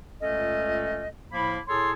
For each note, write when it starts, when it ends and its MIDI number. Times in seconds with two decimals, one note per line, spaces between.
0.21 1.09 37
0.21 1.09 46
0.21 1.09 57
0.21 1.09 61
0.21 1.09 69
0.21 1.09 75
1.32 1.58 45
1.32 1.58 53
1.32 1.58 58
1.32 1.58 83
1.68 1.93 45
1.68 1.93 68
1.68 1.93 69
1.68 1.93 73
1.68 1.93 81
1.68 1.93 84